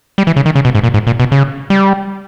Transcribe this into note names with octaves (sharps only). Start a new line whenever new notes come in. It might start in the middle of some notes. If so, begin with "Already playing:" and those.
G3
E3
C#3
D#3
C#3
B2
G#2
A#2
G#2
A#2
B2
C#3
G3